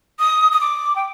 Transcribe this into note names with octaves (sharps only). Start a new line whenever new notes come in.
D#6
D#6
D6
G5